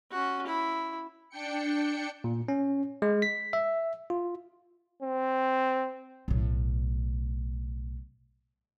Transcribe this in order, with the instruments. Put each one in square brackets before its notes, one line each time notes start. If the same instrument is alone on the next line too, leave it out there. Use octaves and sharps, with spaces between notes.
[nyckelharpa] C#4 F#4
E4
[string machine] D4 G5 C#7
[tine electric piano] A#2
C#4
G#3
B6
E5
F4
[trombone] C4
[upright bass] B1 A2